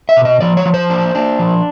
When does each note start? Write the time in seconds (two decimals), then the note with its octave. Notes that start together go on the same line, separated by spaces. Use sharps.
0.09 E5
0.17 B2
0.25 D#5
0.41 F3 D5
0.57 C#5
0.65 F3
0.74 C5
0.90 D4
1.15 D4
1.39 F3